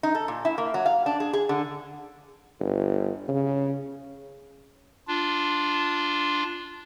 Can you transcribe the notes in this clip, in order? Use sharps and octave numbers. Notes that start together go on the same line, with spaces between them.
D#4
A4
A#2
E4
A#3
F#3
F5
D4
G#4
G#4
D3
G1
C#3
D4 F4